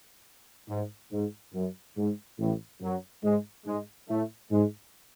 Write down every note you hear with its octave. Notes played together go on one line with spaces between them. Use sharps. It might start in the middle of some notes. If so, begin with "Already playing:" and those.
G#2
G#2
F#2
G#2
A1 A2
F#2 F#3
G#2 G#3
G#2 G#3
A2 A3
G#2 G#3